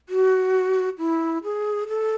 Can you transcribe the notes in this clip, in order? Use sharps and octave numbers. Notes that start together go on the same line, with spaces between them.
F#4
E4
G#4
A4